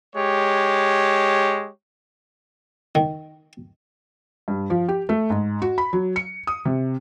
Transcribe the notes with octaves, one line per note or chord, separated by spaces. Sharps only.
G#3 G4 C#5
D#3
G2
F3
G4
A3
G#2
F#4
B5
F#3
C#7
D#6
C3